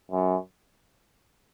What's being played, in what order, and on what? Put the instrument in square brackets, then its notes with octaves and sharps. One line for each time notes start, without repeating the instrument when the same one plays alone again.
[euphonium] F#2